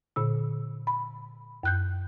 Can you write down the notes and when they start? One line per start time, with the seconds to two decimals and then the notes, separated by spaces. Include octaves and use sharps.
0.16 A#2 D3 E6
0.87 B5
1.63 F#2 F#6 G6